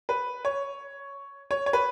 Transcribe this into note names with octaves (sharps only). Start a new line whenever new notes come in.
B4
C#5
C#5
C#5
B4